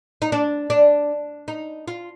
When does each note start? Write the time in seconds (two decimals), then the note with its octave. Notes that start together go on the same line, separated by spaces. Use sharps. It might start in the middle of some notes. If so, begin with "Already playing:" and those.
0.22 D#4
0.32 D4
0.70 D4
1.48 D#4
1.88 F4